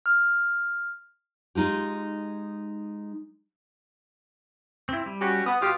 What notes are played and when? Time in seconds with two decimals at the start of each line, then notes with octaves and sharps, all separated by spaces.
0.06 F6
1.55 G#3 D#4 F4 G4
4.89 C4 E4
5.06 G3
5.20 C#4 F#4 G4
5.46 B3 D#6
5.61 B2 F4 G4